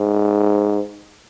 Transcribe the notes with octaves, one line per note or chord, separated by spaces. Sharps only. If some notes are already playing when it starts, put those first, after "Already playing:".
Already playing: G#2